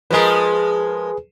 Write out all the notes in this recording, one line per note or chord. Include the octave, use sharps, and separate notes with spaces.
F3 G#3 G#4 A#4 B4